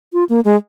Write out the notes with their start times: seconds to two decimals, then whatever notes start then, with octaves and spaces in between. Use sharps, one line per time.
0.13 F4
0.29 A#3
0.45 G#3